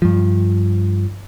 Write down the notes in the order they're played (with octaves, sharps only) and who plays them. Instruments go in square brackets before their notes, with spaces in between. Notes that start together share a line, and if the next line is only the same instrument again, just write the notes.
[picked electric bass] G2 F3